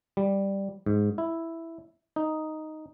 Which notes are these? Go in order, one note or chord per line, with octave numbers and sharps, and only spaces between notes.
G3
G#2
E4
D#4